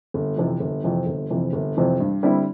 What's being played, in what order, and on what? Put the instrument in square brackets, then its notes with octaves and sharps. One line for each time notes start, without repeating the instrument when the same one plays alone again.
[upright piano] G1
F2 C3 E3
G1
F2 C3 E3
G1
F2 C3 E3
G1
F2 C3 E3
G2
D3 G3 C4 E4